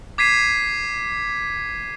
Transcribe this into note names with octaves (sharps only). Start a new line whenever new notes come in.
D6 G#6 B6 C7 D#7